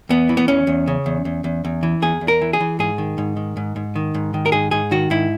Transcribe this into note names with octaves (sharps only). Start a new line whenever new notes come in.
E2 B3
E3
B3
E2 C#4
E2
C#3
E2
E2
E2
E2
E3
E2 G#4
E2
A#4
E3
G#4
E3
G#2 G#4
D#3
G#2
D#3
G#2
G#2
D#3
G#2
D#3
A#4
G#2 G#4
G#2 G#4
D#3 F#4
G#2 E4